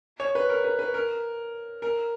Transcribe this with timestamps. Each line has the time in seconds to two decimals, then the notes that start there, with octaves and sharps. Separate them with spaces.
0.20 C#5
0.35 B4
0.49 A#4
0.64 B4
0.79 B4
0.94 A#4
1.82 A#4